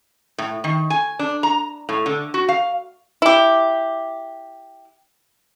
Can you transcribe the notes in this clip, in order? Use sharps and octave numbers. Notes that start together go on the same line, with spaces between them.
A2
D#3
G#5
D4
A#5
A2
D3
F#4
F5
E4 G4